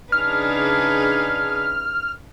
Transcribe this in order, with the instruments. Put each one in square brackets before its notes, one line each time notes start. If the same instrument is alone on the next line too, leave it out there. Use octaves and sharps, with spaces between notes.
[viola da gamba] C#3 D#4 B4 [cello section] D4 G#4 [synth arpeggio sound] F6